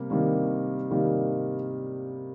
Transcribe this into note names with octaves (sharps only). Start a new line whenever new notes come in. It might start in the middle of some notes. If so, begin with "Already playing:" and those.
Already playing: C3 G3 A#3
C3 D#3 G3 A#3
C3 D#3 G3 A#3